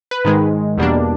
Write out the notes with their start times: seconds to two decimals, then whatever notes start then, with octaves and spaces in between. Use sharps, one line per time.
0.11 B4
0.24 G#2 D#3 G#3
0.78 E2 B2 G3 A#3 D4